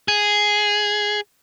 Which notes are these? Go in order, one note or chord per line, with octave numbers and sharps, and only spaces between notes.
G#4